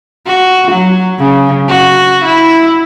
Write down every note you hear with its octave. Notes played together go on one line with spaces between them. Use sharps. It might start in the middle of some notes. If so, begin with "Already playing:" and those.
F#4
F#3
C#3
F#4
E4